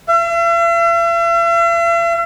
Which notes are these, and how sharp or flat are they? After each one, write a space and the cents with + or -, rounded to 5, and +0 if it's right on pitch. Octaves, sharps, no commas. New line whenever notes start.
E5 +45